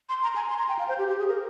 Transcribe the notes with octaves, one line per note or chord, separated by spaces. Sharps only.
C6
A#5
G#5
C6
A#5
G5
F5
C5
G4
G4
G#4
A#4